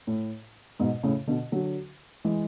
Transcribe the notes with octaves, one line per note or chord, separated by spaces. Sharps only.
A2
G#2 B2
A2 C#3
B2 D3
D3 F#3
E3 G#3